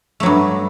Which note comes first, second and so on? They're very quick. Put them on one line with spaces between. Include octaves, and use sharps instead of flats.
A3 F#3 G2